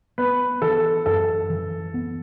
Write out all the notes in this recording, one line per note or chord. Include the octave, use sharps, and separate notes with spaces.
B3 B4
E3 A4
F#2 A4
E3
B3